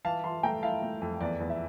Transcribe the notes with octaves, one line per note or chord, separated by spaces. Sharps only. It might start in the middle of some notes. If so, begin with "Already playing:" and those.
E3 F5 A5
E3 A5 C6
A3 G5 A#5
E4 F5 A5
A3
F2
E2 D5
E2
E5